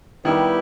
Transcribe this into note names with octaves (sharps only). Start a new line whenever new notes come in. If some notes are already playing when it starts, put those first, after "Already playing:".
D#3 G3 B3 E4 G4 B4